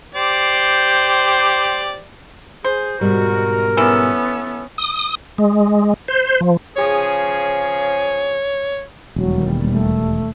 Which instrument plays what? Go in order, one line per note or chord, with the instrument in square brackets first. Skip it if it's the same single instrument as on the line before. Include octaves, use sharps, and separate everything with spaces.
[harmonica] G4 C5 D5
[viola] G#4 [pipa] C5
[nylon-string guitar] G#2 B2 G3 [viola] F#4 [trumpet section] A#4
[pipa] E3 A4 [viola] B3 C#4
[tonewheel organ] D#6
G#3
C5
F3
[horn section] C#3 F3 G#4 [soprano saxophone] C#5
[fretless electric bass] E1 [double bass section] D#2 B2 G3 [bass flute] F#3
[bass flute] A3